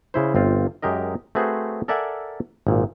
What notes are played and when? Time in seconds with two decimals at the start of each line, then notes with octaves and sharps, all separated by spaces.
0.14 C#3 E4 C5
0.35 G1 C4 F4
0.82 F#2 G#3 G4 A#4 D#5
1.35 A3 C4 F#4 G#4 B4 C5
1.88 A4 A#4 D5 E5 F#5 G#5
2.67 G#1 A#2